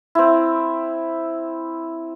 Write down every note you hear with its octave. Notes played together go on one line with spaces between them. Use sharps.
C4 E4